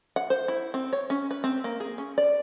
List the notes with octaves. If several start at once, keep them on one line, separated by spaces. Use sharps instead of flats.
F#5
C5
E4
C4
C#5
C#4
B4
C4
A#3
G#4
C#4
D5